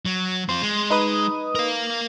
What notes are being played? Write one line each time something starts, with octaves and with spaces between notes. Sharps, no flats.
F#3
C4 F4 C6
G#3
D#4 B4 D#6
A#4 F5